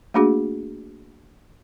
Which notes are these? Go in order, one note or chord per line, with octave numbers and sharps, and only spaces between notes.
A3 A#3 D4 F#4 G#4